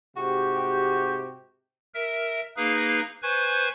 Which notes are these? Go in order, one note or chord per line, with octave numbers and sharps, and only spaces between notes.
G#2 C3 F#4 G4
A#4 E5
A#3 D#4 G#4 B4
B4 C5 G#5 C#6 G#6